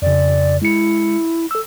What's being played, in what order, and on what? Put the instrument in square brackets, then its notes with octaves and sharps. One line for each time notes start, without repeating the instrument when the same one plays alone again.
[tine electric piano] F2 C#3 [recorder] D5
[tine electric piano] G#3 C#7 [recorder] E4
[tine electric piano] A4 E6